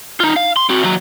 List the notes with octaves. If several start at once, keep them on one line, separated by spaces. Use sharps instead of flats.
D#4 F4
F5
C6
C4 F#4
D#2 F#3